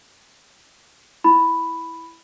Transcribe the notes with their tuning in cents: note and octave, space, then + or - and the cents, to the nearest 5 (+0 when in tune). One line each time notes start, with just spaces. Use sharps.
E4 +0 B5 +0